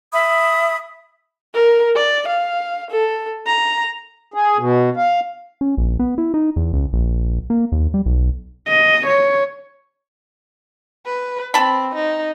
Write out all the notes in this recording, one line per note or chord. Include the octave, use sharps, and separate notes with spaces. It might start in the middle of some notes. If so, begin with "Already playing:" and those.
E5 B5 D#6
A#4
D5
F5
A4
A#5
G#4
B2
F5
C#4
A#1
B3
E4
D#4
E2
C#2
A#1
A#3
D#2
G3
B1
D#5
C#5
B4
C4 A5 B5
D#4